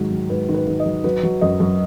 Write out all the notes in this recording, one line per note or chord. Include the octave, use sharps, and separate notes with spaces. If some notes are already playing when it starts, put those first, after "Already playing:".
Already playing: G#2 D#3 F#3
F#3
G#2 B4
D#3
B4
D#3
D#5
F#3
F#3 B4
F#3
F#2 D#5
F#2